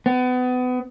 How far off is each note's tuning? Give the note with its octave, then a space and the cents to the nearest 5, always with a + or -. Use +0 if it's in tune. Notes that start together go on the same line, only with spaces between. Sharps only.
B3 +30